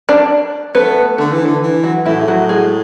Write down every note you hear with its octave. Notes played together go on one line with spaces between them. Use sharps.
D4 D5
A3 B3 B4
D3 A3 A4
E3
D3
E3
F#3 F#4
A2 E3 E4
G#4
F#3 F#4
G#3 G#4